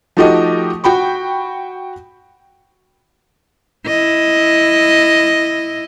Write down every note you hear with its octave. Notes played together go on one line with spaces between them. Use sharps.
F3 A3 D#4 F#4 G4 D#5
F#4 G5 B5 C#6
E4 D#5